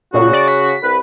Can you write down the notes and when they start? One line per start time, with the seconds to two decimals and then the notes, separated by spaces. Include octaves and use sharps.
0.14 A#2 C#3 F#4
0.33 D5
0.48 B6
0.82 C2 B4